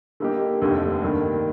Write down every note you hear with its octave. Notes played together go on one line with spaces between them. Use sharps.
D3 G3 A#3 D#4 G4
F1 D#2 D3
G2 D#3 A#3